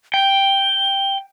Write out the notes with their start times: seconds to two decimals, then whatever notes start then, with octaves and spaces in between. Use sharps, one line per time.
0.14 G5 G7